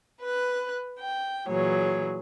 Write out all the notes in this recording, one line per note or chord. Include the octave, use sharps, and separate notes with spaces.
B4 F#6
G5
A#2 E3 F#3 G#4 C#5